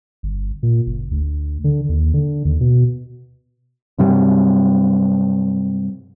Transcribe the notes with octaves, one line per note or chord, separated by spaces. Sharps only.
G1
A#2
F#1
D2
D3
D#2
D3
D#2
B2
G2 C3 F#3 G3